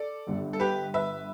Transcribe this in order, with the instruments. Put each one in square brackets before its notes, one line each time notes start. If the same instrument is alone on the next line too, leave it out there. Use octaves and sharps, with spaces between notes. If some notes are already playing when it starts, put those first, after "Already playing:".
Already playing: [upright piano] A4 D5
[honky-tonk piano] G1 G2 D3
[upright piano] A4
G4 B4
B4 E5